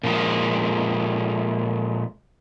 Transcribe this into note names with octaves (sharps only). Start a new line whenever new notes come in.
A#2 F3 G#3